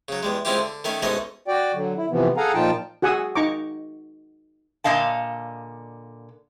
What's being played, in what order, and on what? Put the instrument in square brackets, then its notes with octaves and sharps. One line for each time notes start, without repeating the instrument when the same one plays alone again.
[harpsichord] C#3 F#3
E2 G3 G#3
G#3 C4 C#4 E4 F4 G4
D3
D#3 A3 C#4 B5
A1 G#2 B2 A3 C#4 D#5
[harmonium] F#4 D5 G5
D3 F#3
E4
C3 E3 F3 B3
G#4 A4 F5 F#5 G#5 A#5
A#2 F3 D#4 F4 G5 A5
[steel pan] F#4 G#4 F#5 G#5 D#6 E6
D#4 A#5 C#6 D6
[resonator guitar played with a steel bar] A#2 D3 D#5 F5 A5